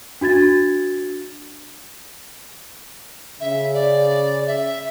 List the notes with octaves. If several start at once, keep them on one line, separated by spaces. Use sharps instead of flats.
D4 F#4 G#6 A6
C#3 E5
D5
E5